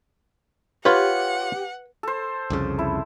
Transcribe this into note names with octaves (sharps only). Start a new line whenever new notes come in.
F4 G4 B4 C#5 F#5
A4 C5
C2 F2 C#3
E4